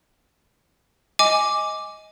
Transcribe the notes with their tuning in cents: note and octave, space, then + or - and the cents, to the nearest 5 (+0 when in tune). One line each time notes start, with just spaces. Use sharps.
D#5 +15 G#5 +0 D6 +0